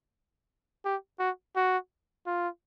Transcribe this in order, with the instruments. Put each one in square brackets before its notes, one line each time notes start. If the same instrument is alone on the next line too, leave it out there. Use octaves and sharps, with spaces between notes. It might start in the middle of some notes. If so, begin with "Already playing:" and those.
[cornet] G4
F#4
F#4
F4